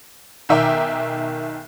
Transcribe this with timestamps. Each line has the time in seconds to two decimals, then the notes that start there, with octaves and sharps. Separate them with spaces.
0.49 B1 D#3 E5 G5 A#5 D6